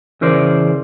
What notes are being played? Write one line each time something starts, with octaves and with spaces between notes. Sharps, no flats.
C#3 E3 A#4 C5 D5